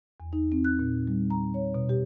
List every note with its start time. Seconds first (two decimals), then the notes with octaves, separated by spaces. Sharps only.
0.20 E2
0.33 D#4
0.52 C4
0.64 F#6
0.79 A#2
1.07 G3
1.30 A#5
1.54 C#5
1.74 B2
1.89 G4